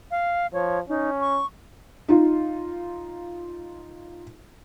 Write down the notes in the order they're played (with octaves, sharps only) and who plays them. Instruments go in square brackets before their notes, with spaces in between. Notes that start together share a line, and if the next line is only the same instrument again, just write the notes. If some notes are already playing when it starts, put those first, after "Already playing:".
[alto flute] F5
[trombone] F3 [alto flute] C#5
[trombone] C#4 [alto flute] D#4
[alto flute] C#6
[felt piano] D#4 F4